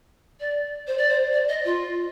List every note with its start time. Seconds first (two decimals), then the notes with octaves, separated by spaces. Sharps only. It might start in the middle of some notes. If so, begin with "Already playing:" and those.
0.40 D5
0.87 C5
0.98 D5
1.08 C5
1.32 D5
1.48 D#5
1.65 F4